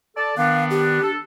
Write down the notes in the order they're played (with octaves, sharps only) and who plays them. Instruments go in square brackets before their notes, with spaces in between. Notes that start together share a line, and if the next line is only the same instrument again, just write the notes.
[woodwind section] A4 D5 A5
[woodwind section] D#3 B3 D4 [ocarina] F5
[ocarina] G4
[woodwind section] D4 A4